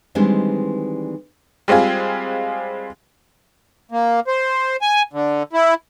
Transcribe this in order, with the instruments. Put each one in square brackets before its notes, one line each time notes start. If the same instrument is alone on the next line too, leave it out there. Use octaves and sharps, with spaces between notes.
[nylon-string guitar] D#3 E3 G3 G#3 C4 D4
[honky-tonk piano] G3 G#3 C4 F4 G#4
[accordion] A#3
C5
G#5
D3
E4